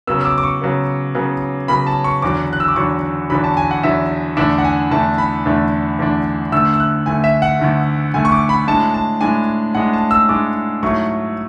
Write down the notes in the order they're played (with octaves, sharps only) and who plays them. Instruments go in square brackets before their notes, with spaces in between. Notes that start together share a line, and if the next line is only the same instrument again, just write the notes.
[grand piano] C#3 F#3 B3 E6
E6
D6
D6
C#6
C#3 F#3 B3
C#3 F#3 B3
C#3 F#3 B3 B5
A5
C#6
E2 D3 F#3 D6
F#6
E6
D6
E2 D3 F#3 C#6
E2 D3 F#3 B5
A5
G#5
F#5
E2 D3 F#3 E5
E2 D3 A3 D4 E5
F#5
G#5
E2 D3 A3 D4 A5
B5
E2 D3 A3 D4
E2 D3 A3 D4
D2 D3 A3 E6
E6
F#6
D2 D3 A3 G#5
E5
F#5
D2 D3 A3
D2 D3 A3 G#5
C#6
D6
B5
A2 G#3 D4 A5
A5
A2 G#3 D4 G#5
A2 G#3 D4 F#5
A5
E6
A2 G#3 D4 D6
G#2 F#3 A3 E4 C#6